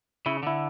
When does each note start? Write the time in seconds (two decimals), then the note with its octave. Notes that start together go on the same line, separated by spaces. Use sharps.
0.26 C#3 E4
0.43 D3 E4